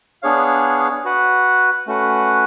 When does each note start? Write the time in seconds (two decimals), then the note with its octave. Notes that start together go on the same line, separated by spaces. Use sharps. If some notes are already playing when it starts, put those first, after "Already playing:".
0.23 B3 D4 G#4 C#5 F5
1.05 F#4 B4 F#5
1.87 A3 C#4 F#4 B4 F#5